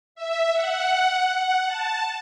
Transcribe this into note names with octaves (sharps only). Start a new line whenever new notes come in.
E5
F#5
F#5
A5